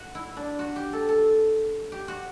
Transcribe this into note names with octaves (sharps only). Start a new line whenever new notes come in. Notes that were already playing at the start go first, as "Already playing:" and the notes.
Already playing: F#4
E4
D4
F#4
G4
A4
A4
G4
F#4